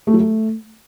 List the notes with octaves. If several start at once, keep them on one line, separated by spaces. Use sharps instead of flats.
A3
F#3
A3